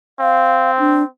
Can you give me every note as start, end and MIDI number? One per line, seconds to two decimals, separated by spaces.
0.20 1.08 60
0.20 0.71 77
0.79 1.03 62